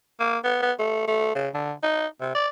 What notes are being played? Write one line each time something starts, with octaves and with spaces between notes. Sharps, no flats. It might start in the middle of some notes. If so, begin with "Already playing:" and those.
A#3
B3
B3
A3
A3
C#3
D3
D#4
C3
D5